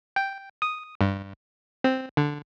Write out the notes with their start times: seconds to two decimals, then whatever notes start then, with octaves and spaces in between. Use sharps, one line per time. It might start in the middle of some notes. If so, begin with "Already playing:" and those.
0.16 G5
0.62 D#6
1.01 G2
1.84 C4
2.17 D3